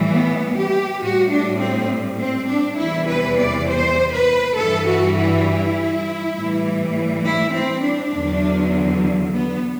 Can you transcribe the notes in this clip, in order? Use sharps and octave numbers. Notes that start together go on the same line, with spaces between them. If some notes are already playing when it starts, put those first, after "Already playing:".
Already playing: A2 E3 G3
B3
G4
A2 G3 F#4
D4
C4
C4
D4
E2 C3 E3 G3 E4
B4
D5
C5
B4
G2 E3 G3 A4
F#4
E4
A2 E3 G3
E4
C4
D4
E2 D3 F#3
B3